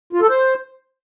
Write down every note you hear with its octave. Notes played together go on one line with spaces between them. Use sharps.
F4
A4
C5